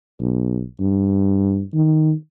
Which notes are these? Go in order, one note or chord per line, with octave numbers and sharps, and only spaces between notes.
B1
G2
D#3